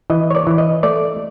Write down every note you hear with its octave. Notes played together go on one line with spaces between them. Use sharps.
E3 D#5
C#5
D5
E3
D#5
A3 D5